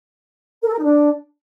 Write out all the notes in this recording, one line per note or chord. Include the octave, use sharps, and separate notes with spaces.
A#4
A4
A#4
D#4
D4